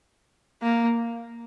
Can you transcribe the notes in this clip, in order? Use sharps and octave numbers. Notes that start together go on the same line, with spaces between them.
A#3